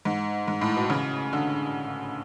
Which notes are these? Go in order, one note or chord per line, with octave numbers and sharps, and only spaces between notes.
G#2
G#2
A2
B2
C#3
D3